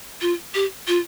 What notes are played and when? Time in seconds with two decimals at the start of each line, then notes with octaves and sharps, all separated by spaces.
0.21 F4
0.54 G4
0.88 F4